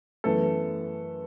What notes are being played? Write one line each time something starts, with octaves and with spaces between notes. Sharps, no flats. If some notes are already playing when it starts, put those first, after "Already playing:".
F#2 E3 A3 B3 A4